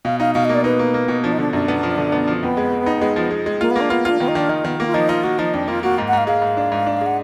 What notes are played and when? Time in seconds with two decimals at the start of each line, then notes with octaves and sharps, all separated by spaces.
0.05 B2 F5
0.20 D#4 F5
0.35 B2 F5
0.45 D#5
0.49 A#3
0.54 D5
0.64 D#4 B4
0.79 A#3
0.94 A#3
1.08 B2
1.24 F3 D4
1.32 D#4
1.38 D3 D4
1.53 F#2 D4
1.68 B3
1.83 F3
1.98 D3
2.12 B3
2.27 F3
2.42 F2 B3
2.57 G#3
2.72 G#3
2.86 D#4
3.02 G#3
3.16 F3
3.31 G#3
3.46 G#3
3.60 A#3 F4
3.70 B3
3.76 A#3
3.81 D4
3.90 B3 F4
4.05 D4 F4
4.20 D#3 B3
4.28 D#4
4.35 D#3 D4
4.49 D#3 D#4
4.65 D#3 B3
4.79 A#3 B3
4.87 F4
4.94 F3 D#4
5.09 D#4 F4
5.23 A#3 F#4
5.39 F3 D#4
5.54 F2 D4
5.68 A#3 F4
5.83 A#3 F#4
5.98 G#2
6.08 F#5
6.13 G#2 F5
6.27 G#3 F5
6.42 G#2
6.57 D4
6.72 G#2
6.86 D4
7.01 G#3
7.06 F#5